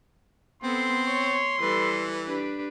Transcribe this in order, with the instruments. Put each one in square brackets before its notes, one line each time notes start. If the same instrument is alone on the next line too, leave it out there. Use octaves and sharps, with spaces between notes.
[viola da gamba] B3 A4 [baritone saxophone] C4 [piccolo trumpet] C6
[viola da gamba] C#5
[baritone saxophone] E3 [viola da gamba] G3 A4 B4
[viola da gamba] D4 G4 B4